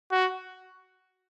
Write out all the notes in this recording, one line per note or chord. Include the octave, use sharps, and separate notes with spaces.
F#4